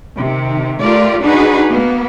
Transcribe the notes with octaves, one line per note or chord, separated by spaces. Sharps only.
C3 D#3
A3 F4 G4 A#4 D5
D4 D#4 F#4 G#4 B4
A#3 B3